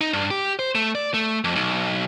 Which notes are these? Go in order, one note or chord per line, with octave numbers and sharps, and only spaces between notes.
D#4
G2
G4
C5
A3
D5
A3
F2
B1